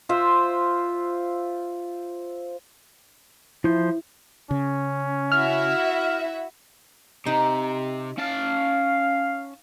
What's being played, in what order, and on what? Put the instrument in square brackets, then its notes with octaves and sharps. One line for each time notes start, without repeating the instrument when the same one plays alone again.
[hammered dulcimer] F4 C5 E5
[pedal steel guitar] F3 C5 [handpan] E4
[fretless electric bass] C#3 [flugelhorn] C#4
[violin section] E4 F#4 E5 [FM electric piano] F6
[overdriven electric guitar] C3 [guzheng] D#4
[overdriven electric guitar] C#4 A5 [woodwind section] F5